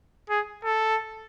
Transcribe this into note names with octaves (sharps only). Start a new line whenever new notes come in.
G#4
A4